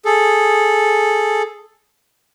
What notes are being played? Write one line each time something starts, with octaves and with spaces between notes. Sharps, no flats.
G#4 A4